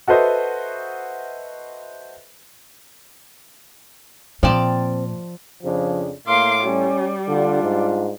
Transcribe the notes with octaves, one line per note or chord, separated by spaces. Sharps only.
F#4 A4 B4 C5 D#5 E5
A#2 F3 C4 D5 A5
F2 C#3 F3 D4
A2 A#3 F5 C6 D6
G3 C#4
D3 D4 F4
G#2